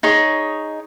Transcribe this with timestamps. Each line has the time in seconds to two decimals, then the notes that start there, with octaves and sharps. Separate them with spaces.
0.03 D#4 G#4 C#5